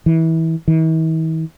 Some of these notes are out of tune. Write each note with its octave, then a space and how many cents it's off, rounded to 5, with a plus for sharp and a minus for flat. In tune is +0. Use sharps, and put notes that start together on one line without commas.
E3 -25
E3 -45